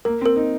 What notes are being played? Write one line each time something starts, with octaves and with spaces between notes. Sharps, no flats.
A#3 A#4
C4
A#4
D#4